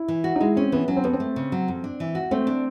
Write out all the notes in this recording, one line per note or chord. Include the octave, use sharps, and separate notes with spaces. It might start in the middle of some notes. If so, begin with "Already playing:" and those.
Already playing: E4
E3
F#4
D#4
G#3 E4
C4 C#4
E3 B3
F#3 C#4
C4
F2 B3
C4
A3
C#3
F#3
F2
D4
E3
F#4
A3 C4
D4